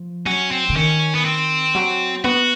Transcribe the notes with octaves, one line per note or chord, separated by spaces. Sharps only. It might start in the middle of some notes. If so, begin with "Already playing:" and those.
Already playing: F3
F#3 C#4
C4
D3
D#3 C#4
B3
C4
F#3
B3 F#4